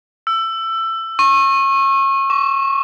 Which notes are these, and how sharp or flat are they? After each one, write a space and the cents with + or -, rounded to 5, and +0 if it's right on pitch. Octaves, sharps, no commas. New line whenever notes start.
E6 +20
C#6 -30
C#6 +30